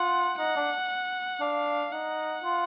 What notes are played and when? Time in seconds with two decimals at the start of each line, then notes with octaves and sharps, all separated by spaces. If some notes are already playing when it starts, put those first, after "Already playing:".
Already playing: F4 F#5
0.39 D#4 F#5
0.56 D4
1.41 D4 F5
1.92 D#4 F#5
2.43 F4